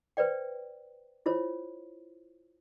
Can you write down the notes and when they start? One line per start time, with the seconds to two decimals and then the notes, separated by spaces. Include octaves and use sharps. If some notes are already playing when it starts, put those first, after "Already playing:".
0.17 B4 C5 D5 G5
1.26 E4 F4 C5 C#5